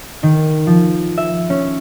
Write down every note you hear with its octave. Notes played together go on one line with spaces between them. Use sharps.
D#3
F3
E5
C#4